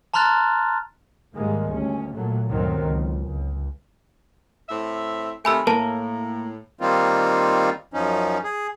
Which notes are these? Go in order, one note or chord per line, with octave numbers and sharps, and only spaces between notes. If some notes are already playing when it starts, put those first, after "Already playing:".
A5 A#5 C6 F6 F#6 A6
G#2 D#3 G3 G#3 A#3
D2 C#4
A#2 F#3 A3
G1 D2 D#3 F#3 C4
C#2
C#2
A2 C4 E5
C3 D#3 A3 G#5 B5 E6
A2 A#3 A#4 A5
D#3 G3 A#3 C4 D#4 F4
F#2 F3 C#4 D#4
G#4